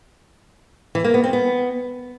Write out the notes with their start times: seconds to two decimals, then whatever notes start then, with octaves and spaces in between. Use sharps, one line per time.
0.95 E3
1.04 A#3
1.14 B3
1.23 C4
1.33 B3